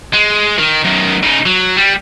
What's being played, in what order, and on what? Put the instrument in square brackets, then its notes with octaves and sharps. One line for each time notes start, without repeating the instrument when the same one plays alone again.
[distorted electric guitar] G#3
D#3
F#2 D#3
C#3 D#4
F#3
G3